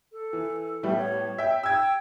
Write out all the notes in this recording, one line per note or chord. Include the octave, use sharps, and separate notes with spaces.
A4
E3
A2 G3 B3 E5
C#5
E5 G5
G5 E6 G#6